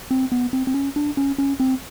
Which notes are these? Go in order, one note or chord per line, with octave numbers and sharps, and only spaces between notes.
C4
B3
C4
C4
C#4
D4
C#4
C#4
C4